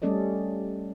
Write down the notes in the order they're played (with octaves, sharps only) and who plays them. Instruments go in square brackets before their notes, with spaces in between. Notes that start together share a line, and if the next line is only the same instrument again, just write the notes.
[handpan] G3 A3 C#4 A4 D5 D#5